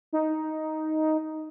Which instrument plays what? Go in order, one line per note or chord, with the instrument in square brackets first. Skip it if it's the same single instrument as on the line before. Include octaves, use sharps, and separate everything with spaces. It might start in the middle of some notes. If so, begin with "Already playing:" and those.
[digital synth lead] D#4